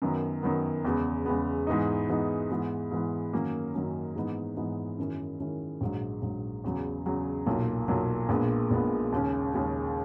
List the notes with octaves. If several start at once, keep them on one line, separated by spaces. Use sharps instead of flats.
F#2 D#3 F#3 B3
F#2 D#3 F#3 B3
E2 C#3 G#3 B3
E2 C#3 G#3 B3
G#2 E3 B3 D#4
G#2 E3 B3 D#4
G#2 E3 B3
G#2 E3 B3
F#2 D#3 F#3 A#3 C#4
F#2 D#3 F#3 A#3 C#4
G#2 E3 B3 D#4
G#2 E3 B3 D#4
F#2 D#3 G#3 C#4 E4
F#2 D#3 G#3 C#4 E4
A#1 G#2 F#3
A#1 G#2 F#3
E2 C#3 F#3
E2 C#3 F#3
B1 A#2 F#3
B1 A#2 F#3
A#1 A#2 G#3 B3
A#1 A#2 G#3 B3
D#2 C#3 G#3 C#4
D#2 C#3 G#3 C#4